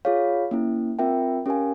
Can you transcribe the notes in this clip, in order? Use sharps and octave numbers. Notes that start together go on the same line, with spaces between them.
F4 G#4 C#5 F5
A#3 C#4 E4
C4 F4 A#4 E5 G5
C#4 G4 A#4 F5 G#5